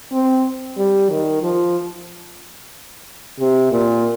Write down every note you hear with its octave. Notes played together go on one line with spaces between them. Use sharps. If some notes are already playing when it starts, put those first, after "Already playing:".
C4
G3
D#3
F3
C3
A#2